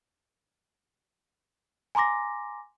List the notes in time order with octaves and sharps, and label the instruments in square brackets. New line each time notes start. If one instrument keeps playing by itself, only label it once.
[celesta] G#5 A#5 C6 D6 A#6